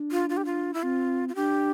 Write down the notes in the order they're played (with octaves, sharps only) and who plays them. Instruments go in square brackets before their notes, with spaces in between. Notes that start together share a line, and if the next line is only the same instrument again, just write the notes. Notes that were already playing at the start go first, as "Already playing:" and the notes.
Already playing: [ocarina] D4
[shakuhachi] F4
F4
G4
F4
E4
[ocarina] C4 [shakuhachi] F4
[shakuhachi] F4
[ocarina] D4 [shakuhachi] G4